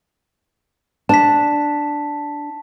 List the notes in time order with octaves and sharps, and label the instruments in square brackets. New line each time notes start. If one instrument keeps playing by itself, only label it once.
[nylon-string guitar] D4 [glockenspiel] A5 B6